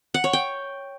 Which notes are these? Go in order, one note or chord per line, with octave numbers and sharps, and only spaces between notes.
F#5
C#5
G5